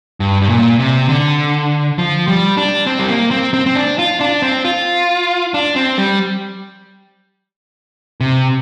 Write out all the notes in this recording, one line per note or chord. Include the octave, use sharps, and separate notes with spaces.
G2
G2
A#2
C3
D3
F3
G3
D4
C4
G3
A#3
C4
C4
C4
D4
F4
D4
C4
F4
D4
C4
G3
C3